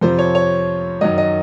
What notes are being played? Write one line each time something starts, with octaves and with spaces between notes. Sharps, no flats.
F2 C3 F3 C5
C#5
C#5
F#2 D#3 F#3 D#5
D#5